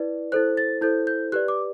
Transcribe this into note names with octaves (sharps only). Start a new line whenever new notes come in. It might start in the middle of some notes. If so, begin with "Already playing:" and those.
Already playing: E4 B4 D5
E4 A4 C5 F#6
A6
E4 A4 C5 G6
G6
G4 B4 D5 F#6
D6